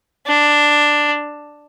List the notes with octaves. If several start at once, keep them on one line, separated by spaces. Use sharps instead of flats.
D4